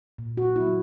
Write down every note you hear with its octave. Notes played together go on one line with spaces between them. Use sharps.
A#2
F#4
F#3 B3 E4